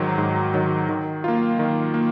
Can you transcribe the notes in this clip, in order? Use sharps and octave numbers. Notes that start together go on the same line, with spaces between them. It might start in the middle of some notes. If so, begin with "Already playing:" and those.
Already playing: G#2 D#3 F#3
G#2
D#3 F#3
D#3
A#3 F4
D#3
A#3